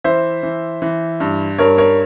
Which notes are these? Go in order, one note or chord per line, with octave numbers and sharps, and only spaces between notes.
E3 C5 E5
E3
E3
G2
G2 A#4 C#5
A#4 C#5